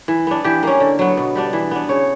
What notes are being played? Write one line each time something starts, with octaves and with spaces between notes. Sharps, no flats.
E3
B3 D4
E3 G4
A#3 C#4
D3
F#3 B3
B2
G3 B3 D4
E3
B3 D4
C#3 C#5